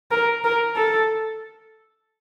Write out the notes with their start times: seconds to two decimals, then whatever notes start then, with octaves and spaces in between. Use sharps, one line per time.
0.11 A#4
0.44 A#4
0.76 A4